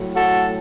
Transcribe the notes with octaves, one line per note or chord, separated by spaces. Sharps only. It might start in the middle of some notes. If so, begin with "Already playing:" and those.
Already playing: A2 F#3
F#4 A4